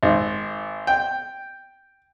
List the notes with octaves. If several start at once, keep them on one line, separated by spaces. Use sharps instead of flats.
G#1
G5